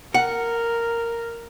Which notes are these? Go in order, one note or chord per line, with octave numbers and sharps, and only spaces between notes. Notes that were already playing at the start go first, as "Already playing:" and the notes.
A#4 F#5